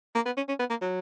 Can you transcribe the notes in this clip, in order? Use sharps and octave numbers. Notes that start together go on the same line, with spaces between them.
A#3
B3
C#4
C#4
B3
A#3
F#3